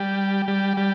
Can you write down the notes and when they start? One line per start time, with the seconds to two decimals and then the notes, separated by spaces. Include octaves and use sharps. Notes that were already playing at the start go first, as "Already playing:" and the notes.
Already playing: G3
0.48 G3
0.77 G3